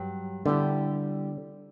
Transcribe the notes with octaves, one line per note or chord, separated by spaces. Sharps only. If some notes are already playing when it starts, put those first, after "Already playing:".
Already playing: G2 F#3 C#4 G4
D3 G3 B3 E4 G4